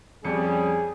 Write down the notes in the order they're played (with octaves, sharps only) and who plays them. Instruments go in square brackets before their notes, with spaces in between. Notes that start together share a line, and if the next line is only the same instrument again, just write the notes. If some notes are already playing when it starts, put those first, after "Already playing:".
[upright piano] F2 C#7 [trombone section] G3 C#4 [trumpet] G#4